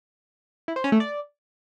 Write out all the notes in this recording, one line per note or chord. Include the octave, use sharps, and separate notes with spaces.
E4
C5
C#4
A3
D5